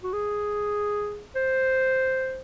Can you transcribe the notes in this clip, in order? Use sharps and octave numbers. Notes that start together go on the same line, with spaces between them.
F#4
G#4
C5